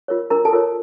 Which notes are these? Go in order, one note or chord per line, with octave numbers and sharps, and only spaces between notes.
F4 A#4 C#5
D4 A#4 A#5
A4 A5
F4 A#4 C#5